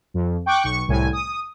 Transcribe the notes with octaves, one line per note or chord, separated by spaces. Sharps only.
F2
G5 C#6 D6 F#6
B1 C#6
C2 A2 G#5
D#6